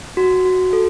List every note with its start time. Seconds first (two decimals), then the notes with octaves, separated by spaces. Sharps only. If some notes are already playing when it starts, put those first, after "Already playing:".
0.17 F#4
0.45 F#4
0.73 A4